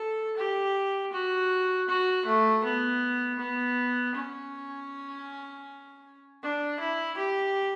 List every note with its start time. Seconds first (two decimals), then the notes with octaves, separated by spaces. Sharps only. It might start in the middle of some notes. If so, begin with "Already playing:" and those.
Already playing: A4
0.37 G4
1.13 F#4
1.88 F#4
2.26 A3
2.64 B3
3.39 B3
4.15 C#4
6.43 D4
6.80 E4
7.17 G4